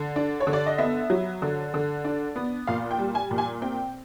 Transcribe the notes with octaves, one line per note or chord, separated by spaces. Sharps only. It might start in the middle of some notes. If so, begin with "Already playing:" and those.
Already playing: D3
D4
C#5
D3
D5
D#5
B3 E5
F#3
D3
D3
D4
B3
A#2 F5
G5
G3
G#5
A#2
G#5
C4 G5